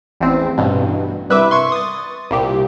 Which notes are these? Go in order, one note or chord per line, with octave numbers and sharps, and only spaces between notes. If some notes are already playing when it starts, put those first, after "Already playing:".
A1 E2 C4
A1 G2 B2
C2 B4 E5 D6
C6 C#6 G#6
D#6 A6
C2 A#2 G4